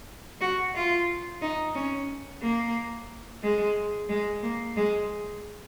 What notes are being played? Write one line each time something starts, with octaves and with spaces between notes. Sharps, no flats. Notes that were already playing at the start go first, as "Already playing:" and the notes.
F#4
F4
D#4
C#4
A#3
G#3
G#3
A#3
G#3